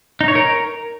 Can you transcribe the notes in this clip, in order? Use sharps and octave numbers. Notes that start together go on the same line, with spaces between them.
D#4
C#5
A#4